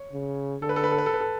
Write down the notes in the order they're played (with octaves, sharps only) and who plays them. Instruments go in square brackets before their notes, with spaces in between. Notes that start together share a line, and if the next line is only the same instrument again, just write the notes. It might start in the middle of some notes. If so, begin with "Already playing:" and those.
Already playing: [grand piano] C#5
[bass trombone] C#3
[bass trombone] D3 [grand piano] A4
[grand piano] B4
A4
B4
A4
B4
A4
B4
A4